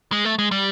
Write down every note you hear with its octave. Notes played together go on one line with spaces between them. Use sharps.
G#3
A3
G#3
G3